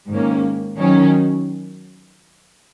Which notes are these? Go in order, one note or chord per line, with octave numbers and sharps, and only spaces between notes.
G#2 D#3 A#3 C#4
D#3 F#3 C#4